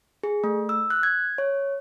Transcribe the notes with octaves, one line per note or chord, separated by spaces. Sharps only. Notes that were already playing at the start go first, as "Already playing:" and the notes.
G#4
A3
E6
F#6
G#6
C#5